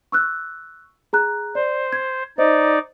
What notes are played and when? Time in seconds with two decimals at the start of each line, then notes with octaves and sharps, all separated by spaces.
0.12 C#6 E6 F#6
1.13 G#4 A#5 F#6
1.55 C5 D5
1.93 G#6
2.38 D#4 C5 D5 D#5